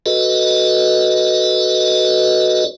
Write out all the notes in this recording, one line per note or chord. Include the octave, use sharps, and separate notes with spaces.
F#4 A4 B4 D#5